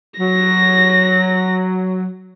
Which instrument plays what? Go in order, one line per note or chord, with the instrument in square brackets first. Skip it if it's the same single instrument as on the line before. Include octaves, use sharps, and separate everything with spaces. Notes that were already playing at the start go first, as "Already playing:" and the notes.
[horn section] F#3 [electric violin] A#6